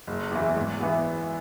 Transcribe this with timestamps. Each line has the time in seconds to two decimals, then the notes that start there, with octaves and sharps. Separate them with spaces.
0.07 F#1
0.31 E2 E3
0.57 G#1
0.80 E3 B3